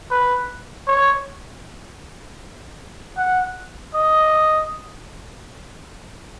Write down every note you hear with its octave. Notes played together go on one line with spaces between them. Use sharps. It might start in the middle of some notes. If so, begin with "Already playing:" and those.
B4
C#5
F#5
D#5